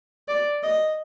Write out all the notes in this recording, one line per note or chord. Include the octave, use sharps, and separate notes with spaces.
D5
D#5